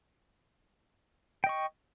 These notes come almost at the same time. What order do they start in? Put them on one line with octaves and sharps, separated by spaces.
G5 D#5 C#6